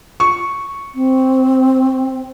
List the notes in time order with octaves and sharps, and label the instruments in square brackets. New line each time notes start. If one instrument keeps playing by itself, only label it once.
[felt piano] C#6
[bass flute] C4